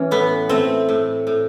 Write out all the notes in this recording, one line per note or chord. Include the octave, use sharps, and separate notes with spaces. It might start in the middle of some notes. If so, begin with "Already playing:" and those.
Already playing: E3 C#4
A2 B3
A3 C4
A2
A2